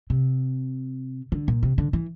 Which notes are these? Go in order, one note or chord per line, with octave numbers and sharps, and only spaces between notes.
C3
D3
A#2
C3
D3
E3